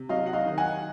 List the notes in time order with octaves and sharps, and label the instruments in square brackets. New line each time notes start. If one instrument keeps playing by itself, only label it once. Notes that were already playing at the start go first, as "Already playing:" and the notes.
Already playing: [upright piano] C3
F#3 D#5 F5
F#5
D#5 F5
D#3
F#5 G#5